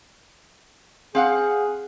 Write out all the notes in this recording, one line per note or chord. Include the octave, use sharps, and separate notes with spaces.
C4 G#4 F5 F#5